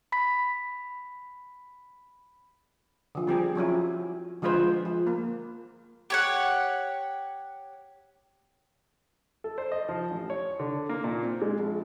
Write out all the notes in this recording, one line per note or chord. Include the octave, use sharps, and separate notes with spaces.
B5 B6
D3 F3
G3 C4 G4 G#4
F3 F#3 C#4 E4
D3 F3 G#3 F4 B4 C5
F3
A#3
G4 C#5 F#5
A4
C5
D#5
F3
A1
C#5
D3
A#3
A#2
C4
G#3
A#1